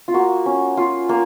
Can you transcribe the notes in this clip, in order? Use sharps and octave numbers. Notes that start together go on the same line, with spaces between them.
F4
A#3 F#4
C#4
F4
A#3